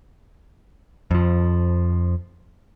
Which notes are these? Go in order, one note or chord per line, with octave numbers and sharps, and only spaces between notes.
F2 F3